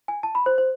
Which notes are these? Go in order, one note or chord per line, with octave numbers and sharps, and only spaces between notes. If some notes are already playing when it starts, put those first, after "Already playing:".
G#5
A5
B5
C5
C5